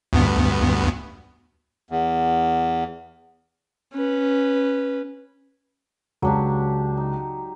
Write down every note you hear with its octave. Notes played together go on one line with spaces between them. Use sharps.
D2 G2 B3
E2
C#4 B4
C#2 F#3 D4 G4
D#4